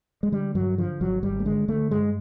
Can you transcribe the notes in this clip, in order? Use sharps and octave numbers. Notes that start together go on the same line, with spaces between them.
G#3
D3 G3
G2 F#3
D3 F3
G#1 F#3
G#1 G3
A3
D3 G#3
D3 A3
G2 G#3